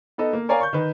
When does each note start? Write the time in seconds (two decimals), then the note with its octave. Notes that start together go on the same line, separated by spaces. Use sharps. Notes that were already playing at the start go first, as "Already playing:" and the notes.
0.18 B3 D#4 A4 D#5
0.33 A#3
0.49 A#4 C#5 D5 F5 G#5 A#5
0.60 C#6 G6
0.73 D#3 B4